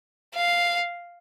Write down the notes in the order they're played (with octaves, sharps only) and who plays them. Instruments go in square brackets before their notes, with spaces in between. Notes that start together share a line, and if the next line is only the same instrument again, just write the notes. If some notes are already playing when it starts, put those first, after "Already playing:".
[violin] F5